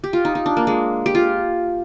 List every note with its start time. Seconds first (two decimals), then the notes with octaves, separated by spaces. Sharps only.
0.04 G4
0.13 F4
0.25 D#4
0.35 D#4
0.46 D4
0.57 A#3
0.67 G#3
1.06 G4
1.15 F4